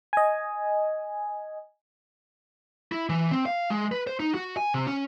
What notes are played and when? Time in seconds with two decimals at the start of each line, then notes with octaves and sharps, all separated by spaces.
0.13 D#5 G#5
2.92 E4
3.09 E3
3.31 C4
3.46 F5
3.70 G#3
3.92 B4
4.07 C5
4.20 D#4
4.34 F#4
4.57 G#5
4.74 C3
4.87 C#4